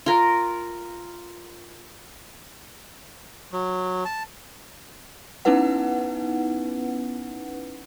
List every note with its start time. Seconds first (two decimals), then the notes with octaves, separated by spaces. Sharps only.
0.06 F4 A#4
3.53 F#3
4.05 A5
5.45 B3 C#4 D#4 E4 B4 F#5